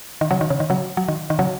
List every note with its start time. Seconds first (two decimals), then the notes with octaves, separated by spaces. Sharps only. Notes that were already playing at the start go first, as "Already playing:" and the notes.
0.21 D#3
0.31 C#3 F#3
0.41 D#3
0.50 C#3
0.60 D#3
0.70 C#3 F#3
0.97 F#3
1.08 D#3
1.30 D#3
1.39 C#3 F#3